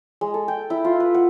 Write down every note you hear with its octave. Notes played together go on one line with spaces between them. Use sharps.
G#3
A4
G5
E4
F4
B4
F#5